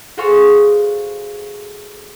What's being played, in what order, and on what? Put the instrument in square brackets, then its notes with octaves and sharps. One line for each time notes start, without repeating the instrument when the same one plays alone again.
[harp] F#4 G#4 A4 C5 F5 C#6